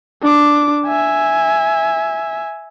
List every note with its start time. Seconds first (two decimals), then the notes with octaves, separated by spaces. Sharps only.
0.22 D4 D6
0.86 E5 G#5